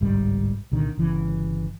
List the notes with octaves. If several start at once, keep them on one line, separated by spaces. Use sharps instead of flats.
G1 C2 G#2 G3
C2 A#2 D3 D#3
G1 C#3 E3